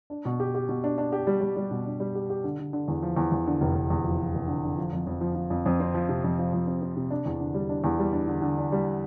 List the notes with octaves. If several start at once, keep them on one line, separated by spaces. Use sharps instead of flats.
D4
B2
G4
G4
B2
D4
D4
G4
G3
G3
G3
B2
D4
G3
G4
G4
D3
D3
D3
E2
F3
E2
E2
D3
F1
F1
E2
F3
F3
F1
D3
D3
F3
F2
F2
F3
F3
F2
F2
C4
F3
C3
F2
F3
F2
C4
C4
C3
D4
E2
D3
G3
D4
E2
G3
D4
D3
D3
D4
G3